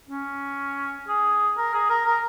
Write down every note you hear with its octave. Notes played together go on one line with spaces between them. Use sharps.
C#4
G#4
A#4
G#4
A#4
A#4